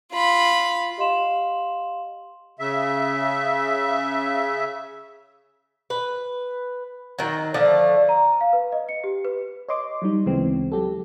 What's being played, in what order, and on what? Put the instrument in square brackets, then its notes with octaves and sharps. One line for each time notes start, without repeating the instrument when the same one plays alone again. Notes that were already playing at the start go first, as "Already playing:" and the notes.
[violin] F4 B5
[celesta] G4 D#5 F5 C6 E7 F#7
[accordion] C#3 E5
[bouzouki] B4
D#3 F#3
D3 F3 A3
[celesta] A#5
F5
B4
D#5
C#7
G4
B4
[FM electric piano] C#5 D#5 C6 D6
F#3 G3 D#4
D2 C#3 E3 G#3 B3 C4
F#3 G4 A4